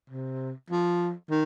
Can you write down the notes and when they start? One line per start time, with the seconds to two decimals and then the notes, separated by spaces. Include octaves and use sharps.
0.10 C3
0.71 F3
1.30 D#3